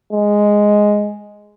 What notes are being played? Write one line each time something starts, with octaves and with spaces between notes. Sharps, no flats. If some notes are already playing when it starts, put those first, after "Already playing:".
G#3